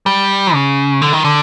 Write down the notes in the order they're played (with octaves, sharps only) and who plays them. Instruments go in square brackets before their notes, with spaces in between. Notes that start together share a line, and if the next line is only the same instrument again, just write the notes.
[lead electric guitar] G3
C#3
D3
D#3
D3